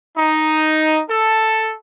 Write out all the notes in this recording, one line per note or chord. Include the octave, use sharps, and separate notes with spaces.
D#4
A4